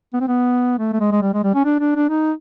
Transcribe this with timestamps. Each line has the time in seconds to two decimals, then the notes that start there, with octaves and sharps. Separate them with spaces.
0.14 B3
0.20 C4
0.28 B3
0.78 A3
0.93 A3
1.00 G#3
1.12 G#3
1.22 G3
1.34 G#3
1.44 G3
1.55 C#4
1.65 D4
1.80 D4
1.96 D4
2.09 D#4